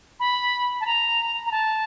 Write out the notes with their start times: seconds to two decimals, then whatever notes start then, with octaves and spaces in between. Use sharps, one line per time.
0.20 B5
0.81 A5
0.86 A#5
1.46 A#5
1.52 A5